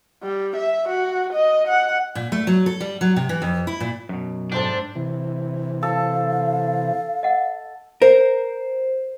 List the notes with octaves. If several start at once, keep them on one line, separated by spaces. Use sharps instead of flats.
G3
E5
F#4
D#5
F#5
A#2
A3
F#3
A4
G3
F#3
C3
E3
F2
E4
A#2
F#2 B2
G#2 D4 A4 C5 G5
C3 E3
A4 F5
D#5 F#5
A#4 C5